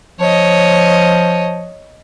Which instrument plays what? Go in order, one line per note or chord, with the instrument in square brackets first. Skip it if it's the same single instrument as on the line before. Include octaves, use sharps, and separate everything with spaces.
[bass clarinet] F3 [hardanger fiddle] C#5 D#5